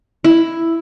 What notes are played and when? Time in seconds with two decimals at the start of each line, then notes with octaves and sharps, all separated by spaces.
0.24 E4